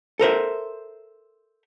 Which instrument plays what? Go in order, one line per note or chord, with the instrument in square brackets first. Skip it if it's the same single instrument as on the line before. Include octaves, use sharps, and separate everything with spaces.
[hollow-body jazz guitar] A4 A#4 C5 E5